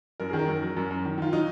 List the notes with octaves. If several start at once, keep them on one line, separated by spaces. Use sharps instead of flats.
F#2 A#4
D#3 G#4
A#4
F#2
F#3
F#2
F#2
D#3
D#3 F4
F#3 D#4